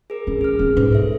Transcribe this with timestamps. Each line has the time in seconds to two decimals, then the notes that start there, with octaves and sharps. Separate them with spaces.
0.10 G#4 A#4
0.27 E3 C#4
0.41 G#4 F6
0.59 C#4 D4
0.77 G#2 B2 B4
0.93 A4 E5